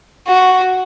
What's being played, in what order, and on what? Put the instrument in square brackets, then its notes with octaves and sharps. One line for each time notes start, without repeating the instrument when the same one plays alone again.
[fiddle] F#4